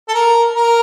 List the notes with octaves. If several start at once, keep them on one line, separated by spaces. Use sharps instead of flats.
A4
A#4
A#4